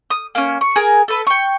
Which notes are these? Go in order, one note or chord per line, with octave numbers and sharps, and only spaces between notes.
D#6
A#3 C#4
C#6
G#4 A#4 G#5
A4 B4
G5 C#6